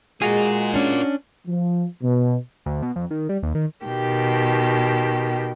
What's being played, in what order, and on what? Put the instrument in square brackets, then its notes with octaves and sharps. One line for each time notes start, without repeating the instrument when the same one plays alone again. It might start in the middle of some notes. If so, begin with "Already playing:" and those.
[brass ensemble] G#3 [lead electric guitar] F4 A#4 [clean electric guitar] F#4 G#4
[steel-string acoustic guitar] C#4 D4
[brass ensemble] F3
B2
[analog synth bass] D2
B2
F2
D#3
G3
D#2
D#3
[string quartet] B2 D#3 G4